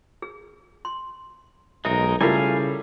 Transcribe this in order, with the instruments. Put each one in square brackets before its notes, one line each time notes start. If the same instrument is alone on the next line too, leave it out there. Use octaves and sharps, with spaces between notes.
[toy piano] G#4
C6
[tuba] B1 [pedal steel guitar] G#3 D#4 A#4 [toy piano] E5
[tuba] C#3 [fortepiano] G3 A3 [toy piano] E4 F4 A#4 [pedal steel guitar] F5 G#5